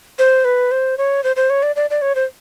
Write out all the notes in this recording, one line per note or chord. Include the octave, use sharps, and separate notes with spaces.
C5
B4
C5
C#5
C5
C5
C#5
D5
D5
D5
C#5
C5